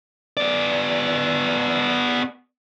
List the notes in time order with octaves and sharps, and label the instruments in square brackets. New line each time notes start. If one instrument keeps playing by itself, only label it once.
[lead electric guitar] B3 D5